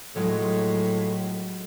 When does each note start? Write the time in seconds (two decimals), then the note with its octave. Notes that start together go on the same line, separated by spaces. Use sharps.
0.16 A2 F#3 G#3 F4